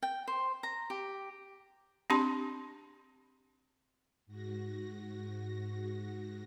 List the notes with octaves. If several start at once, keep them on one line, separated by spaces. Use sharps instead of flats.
G5
C5
A#5
G4
C4 D4 G4 A5 C6
G#2 F#4 A#6